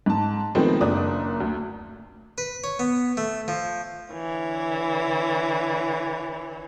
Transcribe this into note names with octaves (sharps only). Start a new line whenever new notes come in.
G#2 A5
D#3 F3 G#3 A3 B3 C4
F#1 D4 D#6
D2
B4
C#5
B3
A3
F3
D3 E3 C#5